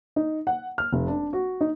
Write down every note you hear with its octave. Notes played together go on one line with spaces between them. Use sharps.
D#4
F#5
F6
F1
D4
F#4
D#4